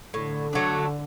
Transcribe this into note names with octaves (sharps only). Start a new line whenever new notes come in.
A2 D3
F#3 A3 D4